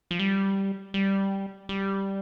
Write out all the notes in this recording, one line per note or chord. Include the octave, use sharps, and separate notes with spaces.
F3
G3
G3
G3